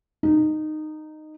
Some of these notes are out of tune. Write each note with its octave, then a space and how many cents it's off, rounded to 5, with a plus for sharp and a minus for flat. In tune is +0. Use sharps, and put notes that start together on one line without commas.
D#4 -15